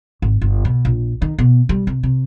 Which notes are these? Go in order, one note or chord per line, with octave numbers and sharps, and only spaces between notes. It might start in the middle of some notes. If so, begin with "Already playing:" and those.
G#1
G1
B2
A#1
D#3
B2
G3
C3
C3